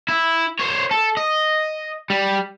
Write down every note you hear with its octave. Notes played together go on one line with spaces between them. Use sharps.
E4
C5 C#5
A4
D#5
G3